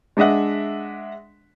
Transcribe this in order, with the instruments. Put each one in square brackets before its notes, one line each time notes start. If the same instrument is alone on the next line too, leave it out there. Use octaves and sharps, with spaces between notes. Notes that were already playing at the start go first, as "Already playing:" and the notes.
[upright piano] G#3 D4 D#5 E5 F#5